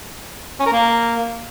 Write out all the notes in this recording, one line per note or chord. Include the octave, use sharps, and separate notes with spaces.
C#4
A#4
A#3